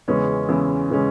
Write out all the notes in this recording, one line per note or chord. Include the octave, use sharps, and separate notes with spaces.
E2 C#3 E3 G#3 C#4
E2 C#3 E3 G#3 C#4
C#3 E3 G#3 C#4